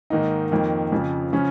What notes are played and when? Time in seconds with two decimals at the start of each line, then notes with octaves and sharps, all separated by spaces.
0.10 G#2 D#3 A#3 D#4
0.51 F2 D#3 A#3
0.92 F2 C#3 F3
1.33 C#3 F3 C#4